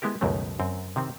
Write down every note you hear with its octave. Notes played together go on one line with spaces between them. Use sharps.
G#3 B3 E4 G4 A#4
C#2 F#2 B2 D#3 F#3 A3
F#2 C4
C3 D#3 C4